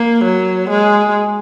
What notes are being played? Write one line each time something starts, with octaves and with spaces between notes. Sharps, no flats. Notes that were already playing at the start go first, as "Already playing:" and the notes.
Already playing: A#3
F#3
G#3